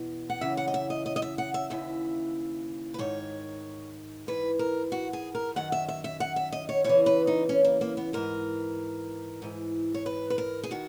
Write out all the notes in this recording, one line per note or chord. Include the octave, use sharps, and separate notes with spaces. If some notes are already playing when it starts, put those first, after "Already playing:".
Already playing: E2 B2
F#5
F#2 C#3 E3 E5
F#5
D#5
E5
D#5
D#5
D#5
E5
F#5
E5
D#2 C#3 E3 E5
B4
G#2 D#3 C#5
G#2 E3 B4
A#4
F#4
G#4
A#4
F#2 D#3 F#5
E5
E5
E5
F#5
E5
D#5
C#5
E2 C#3 E3 C#5
B4
D#4
C#4
A#3
A#3
B3
G#2 E3 A#4
G#2 E3
C#5
B4
B4
A#4
G#4
D#3 F#4